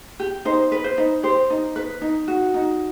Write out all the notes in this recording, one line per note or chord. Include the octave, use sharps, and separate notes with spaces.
G4
D#4 C5
B4
C5
D#4
G4 C5
D#4
B4
D#4
F#4
D#4